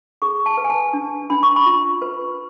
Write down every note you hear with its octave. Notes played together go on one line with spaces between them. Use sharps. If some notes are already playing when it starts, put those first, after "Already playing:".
G#4 C#6
A5
B4
G#5
A5
D4
D4 B5
C#6
B5
F4
B4